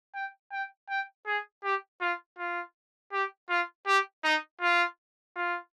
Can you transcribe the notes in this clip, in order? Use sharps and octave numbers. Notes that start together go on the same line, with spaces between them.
G5
G5
G5
G#4
G4
F4
F4
G4
F4
G4
D#4
F4
F4